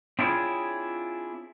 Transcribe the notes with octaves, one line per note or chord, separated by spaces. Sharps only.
C4 D4 E4 F4 G#4 C#5